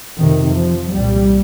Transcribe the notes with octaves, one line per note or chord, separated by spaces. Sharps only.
F2 C3 D#3
F3
C2 A#2 G3